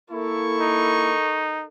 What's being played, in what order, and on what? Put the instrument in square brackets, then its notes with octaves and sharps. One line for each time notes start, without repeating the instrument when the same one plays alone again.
[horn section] A#3 E4 [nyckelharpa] A4 A#4 [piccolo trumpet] C#6
[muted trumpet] D#4